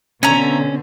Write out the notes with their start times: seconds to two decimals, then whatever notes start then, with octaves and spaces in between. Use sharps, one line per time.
0.23 B2 D3 C4 C#4 C#5 E5 A#5